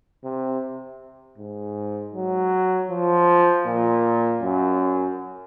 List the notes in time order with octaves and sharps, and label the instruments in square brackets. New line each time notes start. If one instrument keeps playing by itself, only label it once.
[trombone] C3
G#2
F#3
F3
A#2
F#2